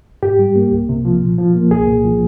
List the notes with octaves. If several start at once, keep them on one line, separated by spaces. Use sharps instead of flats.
G#2 G4
G3
A#3
C2
C3
F3
A#2
F3
A#3
C2 G#4
A#2
F3